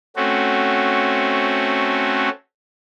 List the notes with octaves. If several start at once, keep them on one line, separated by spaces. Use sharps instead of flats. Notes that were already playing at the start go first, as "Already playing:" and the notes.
A3 C4 C#4 F#4